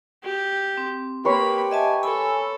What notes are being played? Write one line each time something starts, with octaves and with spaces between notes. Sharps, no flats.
G4
C4
A#3 G4 B4 C#5 B5 C6
D#5 E5 G#5 A5
A4 G#5 B5 E6